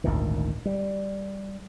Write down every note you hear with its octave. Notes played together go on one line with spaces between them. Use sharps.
G#1 D2 A#2 D#3
G3